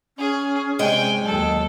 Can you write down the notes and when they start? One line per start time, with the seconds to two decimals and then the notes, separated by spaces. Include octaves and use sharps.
0.18 C#4 G#4
0.79 C3 G#3 C#4 D5 G5 G#5
1.25 D#2 F#3 A4 G5